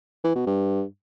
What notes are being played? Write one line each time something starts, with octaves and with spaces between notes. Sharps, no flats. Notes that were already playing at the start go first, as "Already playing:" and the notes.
E3
B2
G2